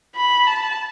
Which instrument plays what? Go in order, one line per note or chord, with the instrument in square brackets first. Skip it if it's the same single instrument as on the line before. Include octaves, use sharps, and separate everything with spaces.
[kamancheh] B5
A5